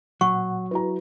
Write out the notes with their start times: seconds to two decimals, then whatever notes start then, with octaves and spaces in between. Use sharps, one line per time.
0.21 A#2 F#3 F#5 C#6
0.71 E4 F#4 B4 A#5